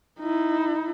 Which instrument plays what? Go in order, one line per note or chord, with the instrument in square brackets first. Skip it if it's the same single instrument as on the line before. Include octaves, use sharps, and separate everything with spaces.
[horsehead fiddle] D#4 E4